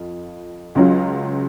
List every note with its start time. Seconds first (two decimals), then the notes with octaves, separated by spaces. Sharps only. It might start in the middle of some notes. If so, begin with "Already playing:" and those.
Already playing: F2 F4
0.75 C#2 C#3 F#3 C#4 F4